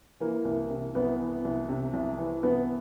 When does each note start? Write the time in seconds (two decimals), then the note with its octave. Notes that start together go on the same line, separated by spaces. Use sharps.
0.20 E3 A#3
0.45 C2
0.70 C3
0.95 C2 B3
1.20 E3
1.45 C2
1.69 C3
1.93 C2
2.18 E3
2.43 C2 B3